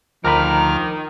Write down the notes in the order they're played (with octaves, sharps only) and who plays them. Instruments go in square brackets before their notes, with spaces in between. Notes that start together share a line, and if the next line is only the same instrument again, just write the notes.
[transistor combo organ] D2 D6 F6 [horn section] D#3 [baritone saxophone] F3 [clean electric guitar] A#4 A#5 B5